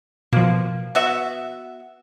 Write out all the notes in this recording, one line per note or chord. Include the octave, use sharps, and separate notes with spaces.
B2 F3 A#3
B3 F#4 E5